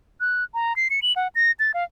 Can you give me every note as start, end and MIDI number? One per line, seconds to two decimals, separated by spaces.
0.20 0.44 90
0.54 0.76 82
0.76 0.88 96
0.90 1.00 97
1.02 1.13 102
1.16 1.28 78
1.35 1.52 94
1.59 1.72 93
1.74 1.84 77